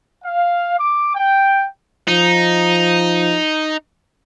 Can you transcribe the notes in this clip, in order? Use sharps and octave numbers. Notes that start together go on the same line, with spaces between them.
F5
D6
G5
F3 D#4